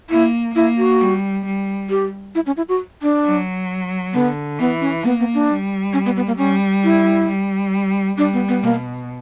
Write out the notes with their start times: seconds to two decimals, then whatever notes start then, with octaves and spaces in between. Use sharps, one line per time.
0.10 A#3 E4
0.55 A#3 E4
0.78 F#4
1.01 G3
1.45 G3
1.90 G4
2.35 E4
2.46 C#4
2.57 E4
2.69 F#4
3.02 D4
3.24 F#3
4.14 D3 B3
4.59 E3 B3
4.81 C#4
5.03 A#3 B3
5.19 B3
5.34 D4
5.49 G3
5.93 C#4
6.05 B3
6.16 B3
6.27 A#3
6.38 G3 C#4
6.84 E4
7.28 G3
8.18 G3 D4
8.33 B3
8.48 B3
8.63 B2 A#3